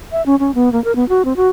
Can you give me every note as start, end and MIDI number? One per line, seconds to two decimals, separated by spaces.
0.12 0.22 76
0.26 0.36 61
0.39 0.54 61
0.55 0.72 59
0.72 0.83 58
0.84 0.95 70
0.96 1.07 59
1.09 1.23 66
1.25 1.33 60
1.36 1.49 66